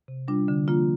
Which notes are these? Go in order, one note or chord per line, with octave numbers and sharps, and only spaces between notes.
C3
G3 D4 F4
D3
F3 A#3 D4 F4